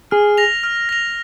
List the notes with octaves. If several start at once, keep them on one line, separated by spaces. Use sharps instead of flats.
G#4 F6
A#6 F7
F6
A#6 F7